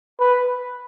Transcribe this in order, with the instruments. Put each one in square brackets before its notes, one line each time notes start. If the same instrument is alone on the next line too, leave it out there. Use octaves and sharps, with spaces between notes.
[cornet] B4